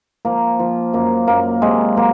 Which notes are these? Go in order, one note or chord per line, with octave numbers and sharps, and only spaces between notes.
F3 A#3
F3
F#2 A#3
F#2 A#3
C3 G#3
F#3 A#3